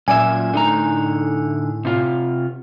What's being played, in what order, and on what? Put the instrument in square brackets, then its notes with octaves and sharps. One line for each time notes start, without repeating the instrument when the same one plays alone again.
[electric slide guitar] F#2 D5 E5 [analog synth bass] A#2 [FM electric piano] G#5
[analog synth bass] A2 [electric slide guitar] D3 D#4 A#5
[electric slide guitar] C3 F4